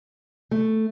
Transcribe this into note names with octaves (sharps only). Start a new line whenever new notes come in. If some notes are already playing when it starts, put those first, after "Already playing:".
A3